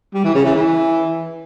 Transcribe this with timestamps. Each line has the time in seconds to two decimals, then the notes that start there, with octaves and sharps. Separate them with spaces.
0.14 G3
0.24 E3
0.35 C#3
0.45 E3
0.55 E3